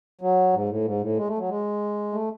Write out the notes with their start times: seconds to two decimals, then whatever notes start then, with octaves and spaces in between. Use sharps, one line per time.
0.21 F#3
0.53 G#2
0.69 A2
0.85 G#2
1.01 A2
1.17 G#3
1.28 A3
1.38 F#3
1.49 G#3
2.13 A3